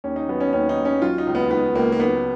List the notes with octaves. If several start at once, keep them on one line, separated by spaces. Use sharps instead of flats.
D#2 C#4
D#4
F#3 B3
C#4
D#2 C#4
D#4
D#2
C#4
F#3 F4
D#4
C#2
B3
C#2 B3
C#2 A#3
A#3
F#3 B3